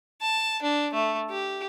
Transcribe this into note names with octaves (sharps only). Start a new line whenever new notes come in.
A5
D4
A3
G4